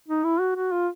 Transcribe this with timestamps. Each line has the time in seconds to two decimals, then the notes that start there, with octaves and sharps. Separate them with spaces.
0.08 D#4
0.24 E4
0.40 F#4
0.56 F#4
0.72 F4